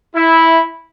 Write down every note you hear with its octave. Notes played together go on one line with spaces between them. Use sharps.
E4